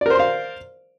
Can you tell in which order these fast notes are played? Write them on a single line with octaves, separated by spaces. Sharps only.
D5 A#4 C5 C6 F5